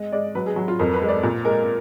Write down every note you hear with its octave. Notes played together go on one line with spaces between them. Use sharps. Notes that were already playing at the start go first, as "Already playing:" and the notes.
Already playing: G#3 D#5
G#3 D5
F#3 B4
G#4
F#3
F4
F2 A#4
B4
G#3
D5
A#2
G#3 A#4